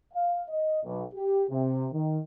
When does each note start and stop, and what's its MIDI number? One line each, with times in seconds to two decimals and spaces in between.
0.13 0.42 77
0.48 0.80 75
0.84 1.03 35
1.14 1.44 67
1.50 1.87 48
1.92 2.18 51